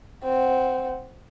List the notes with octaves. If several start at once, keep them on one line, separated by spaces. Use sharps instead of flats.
C4 F#5